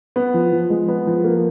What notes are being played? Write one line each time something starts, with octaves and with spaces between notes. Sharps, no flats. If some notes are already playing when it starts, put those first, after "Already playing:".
B3
F3
F3
G#3
B3
F3
A#3